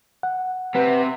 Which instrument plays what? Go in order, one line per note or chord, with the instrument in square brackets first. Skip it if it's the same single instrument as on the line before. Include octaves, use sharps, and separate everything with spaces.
[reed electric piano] F#5
[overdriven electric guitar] C3 [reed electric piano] B4 F#5